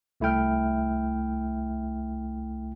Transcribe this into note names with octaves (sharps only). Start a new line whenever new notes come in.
C2 A3 E4 E5 G5 F6